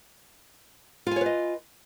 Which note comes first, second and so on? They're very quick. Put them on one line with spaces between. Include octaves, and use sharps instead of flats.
F4 G#5 C#5 B4 D#5